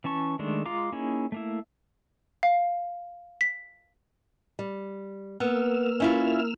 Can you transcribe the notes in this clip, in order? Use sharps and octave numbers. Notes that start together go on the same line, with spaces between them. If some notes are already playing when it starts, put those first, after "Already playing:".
E3 C#4 A5 C#6
D#3 G#3 A3 D4
G#3 F4 F5 A#5 D6
A#3 C#4 D#4 E4 G#4
A3 A#3 E4
F5
B6
G3
A#3 B3 E6 F6
C#4 E4 F4